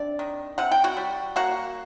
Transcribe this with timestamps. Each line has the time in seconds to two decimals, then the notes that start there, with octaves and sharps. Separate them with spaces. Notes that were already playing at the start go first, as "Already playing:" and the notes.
Already playing: C3 D4 D5
0.19 D#3
0.58 C3 F#5
0.72 G5
0.84 F#4 F#5
0.97 G3
1.36 A#3 F#4 F#5